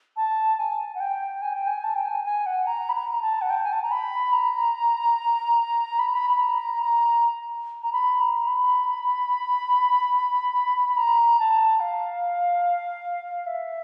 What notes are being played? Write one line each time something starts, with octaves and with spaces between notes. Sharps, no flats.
A5
G#5
F#5
G5
G#5
G5
G#5
A5
G5
G#5
G#5
F#5
A#5
B5
A#5
A#5
A5
F#5
G5
G#5
A5
A#5
B5
A#5
B5
B5
B5
A#5
A#5
A#5
B5
A#5
B5
B5
A#5
A5
F5
E5